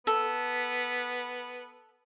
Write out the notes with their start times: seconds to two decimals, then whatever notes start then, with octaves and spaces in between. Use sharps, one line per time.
0.07 B3 A4